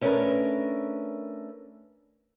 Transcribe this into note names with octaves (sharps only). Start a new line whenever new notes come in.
A3 C#4 D4 F#4 A#4 B4